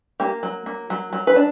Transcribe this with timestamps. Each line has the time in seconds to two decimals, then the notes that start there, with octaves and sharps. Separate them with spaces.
0.20 A#3 G4
0.43 F#3
0.66 A#3
0.90 F#3
1.13 F#3
1.27 B4
1.36 D4